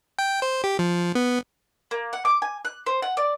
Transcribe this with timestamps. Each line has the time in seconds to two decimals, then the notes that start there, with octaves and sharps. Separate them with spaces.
0.19 G5
0.42 C5
0.64 G4
0.79 F3
1.15 B3
1.91 A#3
2.13 F#5
2.25 D6
2.42 G#5
2.65 F#6
2.86 C5
3.02 F#5
3.17 D5